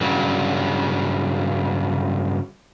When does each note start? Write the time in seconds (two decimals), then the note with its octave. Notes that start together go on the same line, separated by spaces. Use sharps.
0.01 G2 C#3 F#3